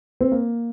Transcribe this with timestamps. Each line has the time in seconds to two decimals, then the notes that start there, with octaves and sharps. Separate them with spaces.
0.21 C4
0.32 A#3